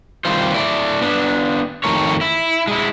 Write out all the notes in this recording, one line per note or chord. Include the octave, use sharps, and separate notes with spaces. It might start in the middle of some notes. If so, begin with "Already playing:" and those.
D#3 G3 C4 F4 C5
A3 E4 D5
B3 D4
F2 D#3 A3 A#4 C#5
E4
G#3 E4